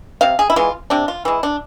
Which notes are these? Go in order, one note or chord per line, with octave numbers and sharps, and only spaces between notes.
C3 F5
G#4
E4
E3 G#3 F4
C3 D4
F4
E3 G#3 E4
D4